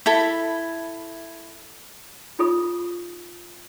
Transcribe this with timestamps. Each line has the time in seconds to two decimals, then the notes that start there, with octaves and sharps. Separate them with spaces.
0.06 E4 A4 B5
2.39 D#4 F4 G#4 A4 B5 D#6